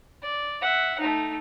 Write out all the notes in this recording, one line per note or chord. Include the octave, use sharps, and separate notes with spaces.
D5
E5 F#5
A3 D#4